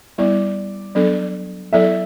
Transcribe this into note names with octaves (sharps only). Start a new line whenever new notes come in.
G3 B3 E4 D5
F#3 B3 D4 A4
F#3 B3 E4 A4 D5 E5